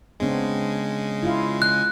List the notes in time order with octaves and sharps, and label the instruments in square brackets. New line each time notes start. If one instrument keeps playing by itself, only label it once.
[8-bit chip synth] C#3 G#3 [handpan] B3 C4 D4
[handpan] E4 F4 F5
[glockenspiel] F#6